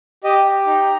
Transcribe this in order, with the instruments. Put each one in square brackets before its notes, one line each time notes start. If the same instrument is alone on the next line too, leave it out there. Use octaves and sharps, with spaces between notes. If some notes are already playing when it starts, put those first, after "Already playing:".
[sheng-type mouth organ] G4 D#5
G4
D#4